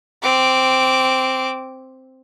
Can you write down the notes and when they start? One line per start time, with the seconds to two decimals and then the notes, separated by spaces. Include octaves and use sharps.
0.23 C4 D6